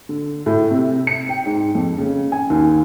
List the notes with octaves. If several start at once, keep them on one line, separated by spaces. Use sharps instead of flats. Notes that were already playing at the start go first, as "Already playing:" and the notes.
D3
A2
C3
C#7
G5
G#2
F2
C#3
G#5
D#2